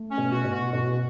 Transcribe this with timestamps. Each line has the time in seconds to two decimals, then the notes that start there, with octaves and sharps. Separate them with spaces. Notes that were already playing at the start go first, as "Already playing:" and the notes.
Already playing: A3
0.11 C#4
0.18 B2
0.32 F#4
0.45 B2
0.52 F#4
0.72 B2 F#4